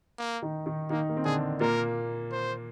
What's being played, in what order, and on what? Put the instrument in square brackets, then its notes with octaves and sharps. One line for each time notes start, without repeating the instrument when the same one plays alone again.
[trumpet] A#3
[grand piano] D#3 D#4
D#3 D#4
[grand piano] D#3 D#4 [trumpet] A#3
[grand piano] A#3
C4
[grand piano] D3 D4 [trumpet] G#4
[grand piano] A#2 A#3 [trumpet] A#4
[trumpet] C5